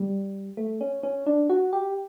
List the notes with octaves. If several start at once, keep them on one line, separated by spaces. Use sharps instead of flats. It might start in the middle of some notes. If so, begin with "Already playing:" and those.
Already playing: G3
A3
C#4
C#4
D4
F#4
G4